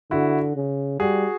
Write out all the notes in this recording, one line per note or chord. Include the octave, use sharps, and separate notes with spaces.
D3 E4 F#4
C#3
G3 F#4 G#4